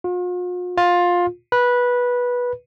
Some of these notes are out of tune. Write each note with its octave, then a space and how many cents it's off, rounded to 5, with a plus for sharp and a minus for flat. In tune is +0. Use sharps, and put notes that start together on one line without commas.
F4 +45
F4 +15
B4 -15